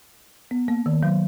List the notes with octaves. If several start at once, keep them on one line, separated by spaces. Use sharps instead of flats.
B3
A#3
D#3
F#3